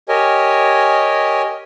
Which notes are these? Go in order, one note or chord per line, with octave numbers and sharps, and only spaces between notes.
G4 A#4 C#5 D#5 G#5